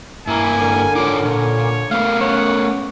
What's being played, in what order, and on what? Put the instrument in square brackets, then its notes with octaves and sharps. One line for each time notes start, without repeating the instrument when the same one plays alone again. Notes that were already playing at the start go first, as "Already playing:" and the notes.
[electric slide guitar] G2 A#3 A#5 [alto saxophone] E4 [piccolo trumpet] G#5
[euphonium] D3 [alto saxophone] A#4
[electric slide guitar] D#4 F4 C#5 [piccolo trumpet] D6
[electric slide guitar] A#2 [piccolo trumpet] C#5
[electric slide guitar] A3 B3 A#4 [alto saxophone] F5
[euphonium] C#4 [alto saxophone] C#5 [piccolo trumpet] F#5